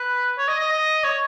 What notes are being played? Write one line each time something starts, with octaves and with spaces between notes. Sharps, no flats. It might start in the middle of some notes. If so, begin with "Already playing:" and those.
Already playing: B4
C#5
D#5
D#5
D#5
C#5